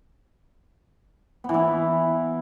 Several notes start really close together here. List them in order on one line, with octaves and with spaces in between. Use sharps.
B3 E3 E4